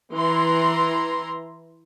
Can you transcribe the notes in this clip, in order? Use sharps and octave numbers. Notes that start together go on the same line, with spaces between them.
E3 E4 A#5 C6